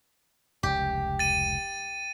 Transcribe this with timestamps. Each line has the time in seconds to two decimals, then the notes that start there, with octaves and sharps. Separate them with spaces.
0.63 F1 C#2 C#3 G4
1.19 A6 D#7